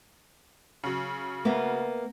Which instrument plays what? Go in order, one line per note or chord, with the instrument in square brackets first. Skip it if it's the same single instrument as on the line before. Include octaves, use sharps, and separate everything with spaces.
[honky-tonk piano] C#3 F#3
[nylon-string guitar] A#3 B3 E5